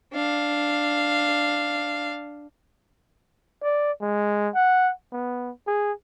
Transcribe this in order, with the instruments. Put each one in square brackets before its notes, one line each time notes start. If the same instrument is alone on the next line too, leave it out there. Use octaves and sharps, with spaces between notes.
[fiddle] D4 F5
[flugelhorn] D5
G#3
F#5
B3
G#4